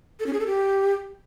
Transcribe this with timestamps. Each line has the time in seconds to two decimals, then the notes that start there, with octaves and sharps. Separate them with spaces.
0.20 A4
0.26 C#4
0.33 G#4
0.40 A4
0.47 G4